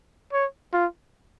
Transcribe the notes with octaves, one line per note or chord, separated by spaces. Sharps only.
C#5
F4